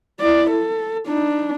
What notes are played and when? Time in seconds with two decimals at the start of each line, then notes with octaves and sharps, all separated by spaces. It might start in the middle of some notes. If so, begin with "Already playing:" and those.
0.20 E4 D5
0.50 A4
1.07 D4 D#4